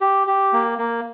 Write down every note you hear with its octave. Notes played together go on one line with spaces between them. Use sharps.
G4
G4
A#3
A#3